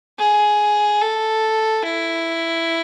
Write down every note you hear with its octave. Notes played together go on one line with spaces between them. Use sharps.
G#4
A4
E4